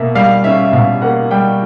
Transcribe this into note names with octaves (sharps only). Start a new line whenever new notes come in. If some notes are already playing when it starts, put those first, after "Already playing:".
Already playing: B2 A#3 E5
G3 F5
C#4 E5
E5
B2 F5
A#3 F#5
G3 G5